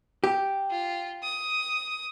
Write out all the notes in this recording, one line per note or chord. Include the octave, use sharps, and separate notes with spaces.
G4
F4
D#6